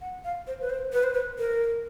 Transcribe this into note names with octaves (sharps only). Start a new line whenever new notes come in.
F#5
F5
C5
B4
C5
B4
C5
B4
A#4